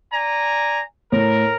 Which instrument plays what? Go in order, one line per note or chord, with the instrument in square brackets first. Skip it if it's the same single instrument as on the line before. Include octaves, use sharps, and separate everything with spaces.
[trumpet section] D5 G#5 A#5
[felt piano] A2 [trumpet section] A#4